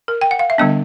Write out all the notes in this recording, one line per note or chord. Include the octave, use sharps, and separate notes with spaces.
A#4
G5
F#5
F5
E5
D3 G3 B3 D4 D#5